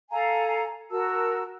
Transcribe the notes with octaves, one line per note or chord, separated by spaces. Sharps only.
A4 F5 G#5 A#5
F#4 A#4 A5 E6